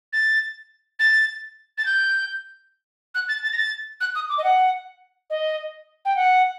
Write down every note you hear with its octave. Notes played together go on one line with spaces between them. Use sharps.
A6
A6
A6
G6
F#6
A6
A6
A#6
A6
F#6
D#6
D6
D#5
F#5
D#5
G5
F#5